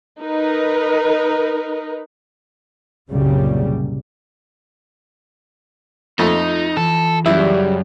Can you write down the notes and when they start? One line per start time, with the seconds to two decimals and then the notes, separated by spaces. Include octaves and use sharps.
0.21 D#4 A#4 B4
3.11 C2 F#2 A#2 C#3 G3
6.19 F2 A3 D#4 F4 D#5
6.77 E3 F4 A4
7.26 F#2 C#3 G3 E4